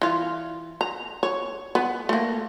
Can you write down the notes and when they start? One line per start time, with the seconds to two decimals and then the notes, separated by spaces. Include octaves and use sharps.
0.02 E3 F4
0.81 A#5
1.23 C#5
1.75 B3
2.09 A3 A#3